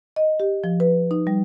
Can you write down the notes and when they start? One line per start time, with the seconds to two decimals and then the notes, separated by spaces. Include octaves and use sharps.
0.16 D#5
0.40 G4
0.64 F3
0.80 B4
1.11 D#4
1.27 G3